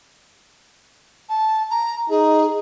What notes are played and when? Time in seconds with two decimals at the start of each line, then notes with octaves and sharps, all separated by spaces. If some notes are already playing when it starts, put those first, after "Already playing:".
1.29 A5
1.71 A#5
2.10 D#4 G#4